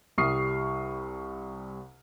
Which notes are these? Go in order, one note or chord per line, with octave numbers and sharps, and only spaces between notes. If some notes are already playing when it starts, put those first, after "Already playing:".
C2 G3 C#6 D#6 F6 C7